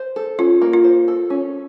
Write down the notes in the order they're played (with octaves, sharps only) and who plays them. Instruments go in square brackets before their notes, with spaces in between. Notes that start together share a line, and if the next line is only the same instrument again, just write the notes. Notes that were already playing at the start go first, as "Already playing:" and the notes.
Already playing: [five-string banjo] C5
A4
[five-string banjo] C#4 [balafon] F4
[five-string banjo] A#3
[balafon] F4
[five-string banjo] C5
A4
C#4